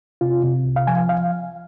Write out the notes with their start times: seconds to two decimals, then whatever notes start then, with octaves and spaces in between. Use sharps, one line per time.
0.21 C3 F4
0.44 C3
0.66 C2
0.76 F5
0.87 F3 G#5
1.09 F5